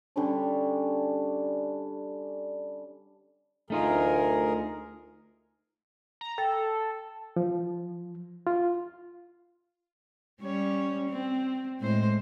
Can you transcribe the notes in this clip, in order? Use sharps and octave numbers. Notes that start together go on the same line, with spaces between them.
D3 G3 C#4 D4
D2 A3 D#4 F4 G#4 A#4
A#5
A4 G5
F3
F4
G3 C#4 C#5
C4
A2 G#3 C5